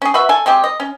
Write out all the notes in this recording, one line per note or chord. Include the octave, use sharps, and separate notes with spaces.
C#4 G#4
F#4 B4 E5
A4 G#5
G#3 C4 G4 G#4
D#5
C#4